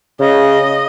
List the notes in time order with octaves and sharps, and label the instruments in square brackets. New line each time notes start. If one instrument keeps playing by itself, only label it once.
[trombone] C#3 [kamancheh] D#5